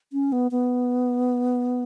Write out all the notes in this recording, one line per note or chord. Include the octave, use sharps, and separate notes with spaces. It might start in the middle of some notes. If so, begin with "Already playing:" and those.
C#4
B3
B3